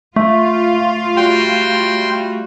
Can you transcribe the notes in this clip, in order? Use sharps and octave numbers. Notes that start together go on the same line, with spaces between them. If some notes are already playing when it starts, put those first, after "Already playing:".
A3 F4
G3 F#4 G5 C6